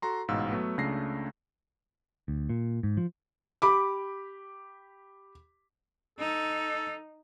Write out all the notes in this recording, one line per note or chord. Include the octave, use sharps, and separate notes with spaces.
F#4 A4 A#5 C6
A1 G#2 B2 F5 E6
F#3 A3 B3
C#2 C#3 A3 D4 A#6 C7
D2
A#2
G#2
F3
G4 B5 D6
D#4 A4